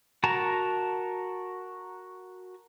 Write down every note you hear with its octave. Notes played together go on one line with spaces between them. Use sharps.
F#4 A#4 A5 A#5